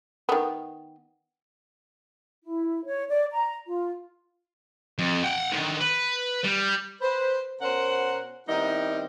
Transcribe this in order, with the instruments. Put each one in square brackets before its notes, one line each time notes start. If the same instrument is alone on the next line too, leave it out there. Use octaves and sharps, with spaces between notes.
[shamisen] D#3 B3
[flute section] E4
C#5
D5
A#5
F4
[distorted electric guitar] F2
F#5 G5
D3 D#3
B4
G3
[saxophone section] B4 C5
B2 C#4 A#4 C5 F#5
D#3 G3 B3 C4 D#4 E4